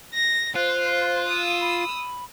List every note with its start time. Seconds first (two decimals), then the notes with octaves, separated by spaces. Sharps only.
0.14 A#6
0.56 F4 C5 F#6
1.28 D#6 E6
1.61 B5